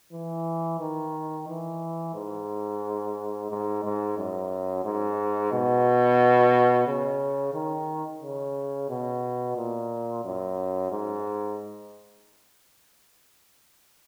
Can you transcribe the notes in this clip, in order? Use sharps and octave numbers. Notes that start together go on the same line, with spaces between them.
E3
D#3
E3
G#2
G#2
G#2
F#2
G#2
B2
C#3
D#3
C#3
B2
A#2
F#2
G#2